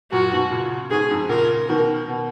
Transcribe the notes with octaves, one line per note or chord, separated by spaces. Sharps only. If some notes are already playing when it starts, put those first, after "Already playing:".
F#2 A#2 F#4
G#2 B2
A#2 C#3
G#2 B2 G#4
F2 G#2
A#2 C#3 A#4
B2 D#3 A#4
B2